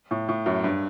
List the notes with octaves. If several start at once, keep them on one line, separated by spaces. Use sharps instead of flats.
A2
A2
F#2
G2